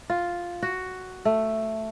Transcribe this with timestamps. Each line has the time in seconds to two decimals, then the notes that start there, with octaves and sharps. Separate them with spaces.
0.10 F4
0.63 F#4
1.25 A3